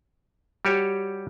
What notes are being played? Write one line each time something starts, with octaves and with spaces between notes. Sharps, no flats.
G3 F#4 G4 C#5